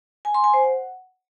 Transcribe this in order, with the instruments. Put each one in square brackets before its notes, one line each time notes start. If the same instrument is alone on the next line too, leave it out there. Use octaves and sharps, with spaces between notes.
[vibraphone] G#5
C6
G#5
C5
F#5